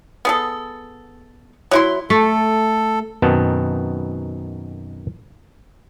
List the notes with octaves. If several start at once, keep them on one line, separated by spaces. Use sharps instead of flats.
B3 G#4 A4
F#3 E4 C6
A3 A4
F#2 B2 D#3 B3 C4 A5